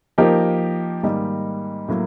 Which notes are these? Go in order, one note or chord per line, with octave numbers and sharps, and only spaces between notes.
F3 A#3 D#4 G4 A#4
G#2 D#3 G3 A#3 D#4
A2 F#3 A#3